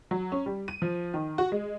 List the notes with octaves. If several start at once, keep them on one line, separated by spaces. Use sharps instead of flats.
F#3
C#4
G3
D#7
F3
D#3
F#4
G#3